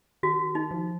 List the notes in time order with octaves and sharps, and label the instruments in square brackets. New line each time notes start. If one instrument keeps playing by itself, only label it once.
[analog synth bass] D#3 [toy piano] F#4
[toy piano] D#4
[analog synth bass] F3